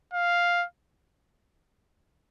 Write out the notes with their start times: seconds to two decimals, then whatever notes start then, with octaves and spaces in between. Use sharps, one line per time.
0.14 F5